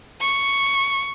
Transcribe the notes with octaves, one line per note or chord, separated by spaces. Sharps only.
C#6